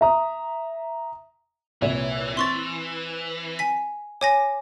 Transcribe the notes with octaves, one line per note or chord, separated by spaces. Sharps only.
E5 A#5 D#6
C2 A#2 E3 C#5
C4 C6 C#6 A6
G#5 B6
C#5 G#5 D6 A#6